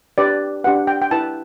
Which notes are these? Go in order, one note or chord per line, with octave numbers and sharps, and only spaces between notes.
D4 G4 B4 D5
D4 G4 B4 F#5
G5
G5
E4 B4 A5